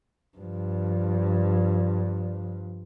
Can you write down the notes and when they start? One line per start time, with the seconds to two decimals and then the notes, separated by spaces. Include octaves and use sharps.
0.37 G2 F3